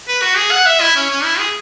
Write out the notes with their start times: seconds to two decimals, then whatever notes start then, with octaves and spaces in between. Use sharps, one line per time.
0.08 B4
0.22 F#4
0.37 G#4
0.51 F#5
0.66 E5
0.81 E4
0.96 C#4
1.11 C#4
1.24 E4
1.39 G#4